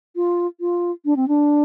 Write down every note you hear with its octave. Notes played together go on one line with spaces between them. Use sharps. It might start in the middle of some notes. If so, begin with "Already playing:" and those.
F4
F4
D4
C4
D4